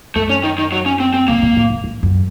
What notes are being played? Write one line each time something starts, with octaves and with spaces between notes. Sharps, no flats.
F#2 A3
C#4
D#3
D#3
F#3
C#4
C4
C4
C3 A#3
A#2
A2
F#2
F2
F#2